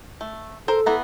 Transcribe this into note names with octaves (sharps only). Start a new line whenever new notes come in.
A3
A4 A#4 C5
E3 B3 A#5